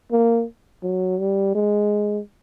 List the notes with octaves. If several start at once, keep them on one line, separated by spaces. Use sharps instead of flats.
A#3
F#3
G3
G#3